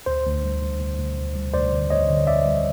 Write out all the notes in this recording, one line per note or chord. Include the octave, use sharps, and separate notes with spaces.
D2 C5
D2
G3
D2
D2
D2
D2
G3
D2 C5 D5
D3
D2 C#5 D#5
D3
D3 D5 E5
G3